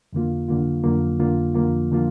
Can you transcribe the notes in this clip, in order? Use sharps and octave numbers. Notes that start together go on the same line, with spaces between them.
F2 D3 A#3 F4
F2 D3 A#3 F4
F2 D3 A#3 F4
F2 D3 A#3 F4
F2 D3 F3 A#3 F4
D3 F3 A#3 F4